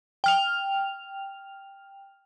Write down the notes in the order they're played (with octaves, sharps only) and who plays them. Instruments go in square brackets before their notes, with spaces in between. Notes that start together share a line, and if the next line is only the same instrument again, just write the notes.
[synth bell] G5 F6 F7